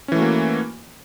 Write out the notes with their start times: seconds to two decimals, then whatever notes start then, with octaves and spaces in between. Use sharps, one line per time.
0.08 C#4
0.12 E3
0.15 A3
0.19 F#4
0.22 A#3